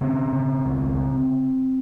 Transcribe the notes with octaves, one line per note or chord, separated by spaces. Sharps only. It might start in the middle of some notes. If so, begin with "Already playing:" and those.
C#3 C4
C#3
C#2